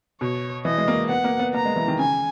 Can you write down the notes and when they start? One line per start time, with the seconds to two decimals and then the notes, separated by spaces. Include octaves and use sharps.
0.21 B2 C#5
0.65 E3 D#5
0.78 G#3
0.88 A#3
1.09 B3 F#5
1.24 A#3
1.39 B3
1.54 A#3 A#5
1.65 G#3
1.76 E3
1.88 D#3
1.99 C#3 G#5